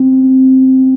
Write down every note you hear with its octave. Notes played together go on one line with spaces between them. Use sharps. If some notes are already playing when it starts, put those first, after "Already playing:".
Already playing: C4